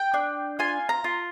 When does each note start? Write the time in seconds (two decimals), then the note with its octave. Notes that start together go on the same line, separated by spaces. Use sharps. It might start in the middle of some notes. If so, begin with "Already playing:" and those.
Already playing: G5
0.14 D4
0.59 F4 G#5
0.89 A#5
1.04 F4